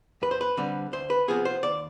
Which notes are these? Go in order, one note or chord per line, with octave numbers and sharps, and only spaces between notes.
F2 B4
C5
B4
D3 G3 C4
D2 C5
B4
C3 F3 B3 G#4
C5
D#2 D5